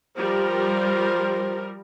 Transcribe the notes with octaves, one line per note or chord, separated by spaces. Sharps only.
F3 G3 A#4 C5